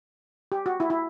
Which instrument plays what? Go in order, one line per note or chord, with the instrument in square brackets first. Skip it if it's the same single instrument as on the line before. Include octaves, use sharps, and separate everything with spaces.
[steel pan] G4
F#4
E4
E4